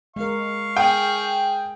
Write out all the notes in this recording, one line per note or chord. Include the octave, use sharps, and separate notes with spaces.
G#3 A#4 F5 C#6
G#4 G5